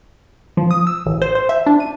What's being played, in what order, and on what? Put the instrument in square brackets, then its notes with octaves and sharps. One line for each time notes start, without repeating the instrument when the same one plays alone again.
[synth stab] F3
D#6
E6
A1
C5
C5
E5
D4
D#7